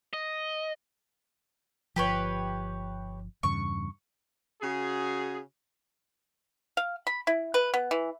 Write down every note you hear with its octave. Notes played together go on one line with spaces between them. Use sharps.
D#5
G1 F3 G4 B4 C#5
E2 G2 C#3 C#6
C#3 F#4 G#4
F5
B5
E4
B4
B3
E3